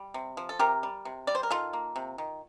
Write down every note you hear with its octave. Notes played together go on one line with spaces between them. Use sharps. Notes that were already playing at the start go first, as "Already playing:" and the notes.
Already playing: G3
C3
F3
A4
C3 G4 A#4
G3
C3
G3 D5
C5
A#4
D#3 F4 A4
A#3
C3
D#3